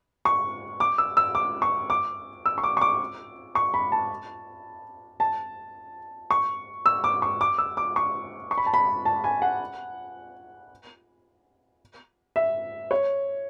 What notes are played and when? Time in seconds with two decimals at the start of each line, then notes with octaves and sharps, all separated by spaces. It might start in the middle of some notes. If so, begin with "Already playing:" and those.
0.25 C#6
0.80 D6
0.98 E6
1.17 E6
1.35 D6
1.62 C#6
1.90 D6
2.46 E6
2.58 C#6
2.63 D6
2.77 C#6
2.81 D6
3.55 C#6
3.74 B5
3.92 A5
5.20 A5
6.31 C#6
6.86 E6
7.04 D6
7.22 C#6
7.41 D6
7.58 E6
7.77 D6
7.96 C#6
8.51 C#6
8.58 B5
8.66 A5
8.74 B5
9.05 A5
9.24 G#5
9.42 F#5
12.36 E5
12.91 C#5